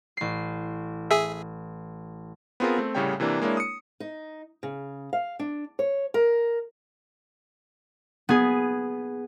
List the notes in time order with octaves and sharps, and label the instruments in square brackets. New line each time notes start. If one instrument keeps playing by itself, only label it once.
[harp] A1 C7
[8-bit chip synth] G#4 E5
[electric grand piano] B3 C4 F4 G#4 A#4
A3 C4
C2 A2 C#3 G3 C#5 G5
C3 E3 A#3 D4
G#3 A#3 D4 E4 C#5
D#6 C#7
[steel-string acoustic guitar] D#4
C#3
F5
D4
C#5
A#4
[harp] B3 G#4